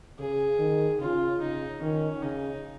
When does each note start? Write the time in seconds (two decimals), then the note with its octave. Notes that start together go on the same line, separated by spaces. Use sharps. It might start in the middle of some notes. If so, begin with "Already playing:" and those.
0.19 C#3 G#4
0.59 D#3
1.00 C#3 F4
1.40 C#3 D#4
1.81 D#3 C#4
2.22 C#3 D#4